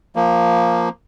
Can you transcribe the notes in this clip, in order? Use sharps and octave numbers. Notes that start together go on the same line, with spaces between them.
F3 A#3